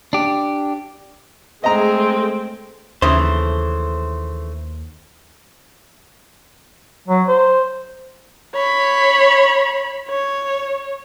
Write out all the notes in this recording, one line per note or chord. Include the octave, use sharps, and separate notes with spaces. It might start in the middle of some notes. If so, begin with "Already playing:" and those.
D4 G4
G#3 A3 C4 G#4 D#5 A#5
D#2 C#3 E3 A3 C5
F#3
C5
C#5 B5
C#5